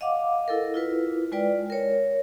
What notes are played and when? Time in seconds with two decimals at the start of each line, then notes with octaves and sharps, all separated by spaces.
0.01 D#5 F5 F#5 D6
0.48 E4 A4 A#4
0.74 E4 F4 B4
1.32 G#3 F4 B4 D5 G5
1.70 A#4 C#5